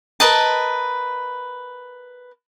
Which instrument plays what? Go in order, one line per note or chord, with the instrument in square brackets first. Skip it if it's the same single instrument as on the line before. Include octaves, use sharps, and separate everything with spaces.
[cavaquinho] A#4 B4 D#5 A5